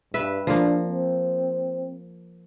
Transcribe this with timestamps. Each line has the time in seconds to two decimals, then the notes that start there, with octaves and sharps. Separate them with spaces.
0.14 G2 B4 E5
0.47 F3 A#3 D4
0.87 C4